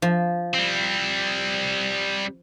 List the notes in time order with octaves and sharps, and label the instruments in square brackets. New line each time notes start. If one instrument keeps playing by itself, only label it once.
[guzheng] F3
[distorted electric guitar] G3 C4